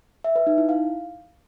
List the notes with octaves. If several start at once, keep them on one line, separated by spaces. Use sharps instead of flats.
E5
B4
D#4
E4
F5